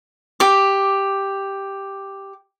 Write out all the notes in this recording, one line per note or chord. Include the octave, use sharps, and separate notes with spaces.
G4 D6